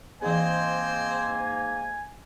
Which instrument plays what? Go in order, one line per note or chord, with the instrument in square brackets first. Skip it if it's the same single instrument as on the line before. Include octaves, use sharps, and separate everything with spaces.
[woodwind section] G#2 A#3 [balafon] E3 G#4 [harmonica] C4 C5 D#5 [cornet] G#5